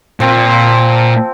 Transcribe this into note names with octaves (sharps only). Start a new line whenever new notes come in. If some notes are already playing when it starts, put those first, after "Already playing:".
A#2 F3 C4